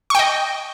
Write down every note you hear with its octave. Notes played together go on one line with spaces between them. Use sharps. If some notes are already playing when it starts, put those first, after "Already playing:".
D#5 G5 C#6